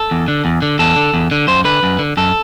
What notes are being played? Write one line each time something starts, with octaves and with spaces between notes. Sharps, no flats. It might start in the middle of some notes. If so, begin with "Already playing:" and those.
Already playing: A4
E2
D3
E2
D3
E2 A4
D3
E2
D3
F#2 C5
D3 B4
F#2
D3
F#2 A4